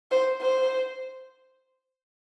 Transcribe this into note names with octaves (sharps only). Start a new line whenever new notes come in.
C5
C5